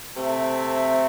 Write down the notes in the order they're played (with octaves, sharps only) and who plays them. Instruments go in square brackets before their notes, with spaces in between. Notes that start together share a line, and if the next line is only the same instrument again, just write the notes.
[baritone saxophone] C3 [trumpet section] A3 C4 A4 E5